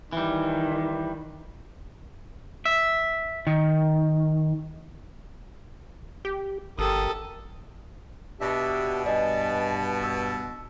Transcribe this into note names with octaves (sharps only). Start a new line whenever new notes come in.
D#3 E3 G3
E5
D#3
G4
G1 G4 A4 A#4 D#6
B2 D4 G4 E5
G2 D5 D#5 G#5 A5
E6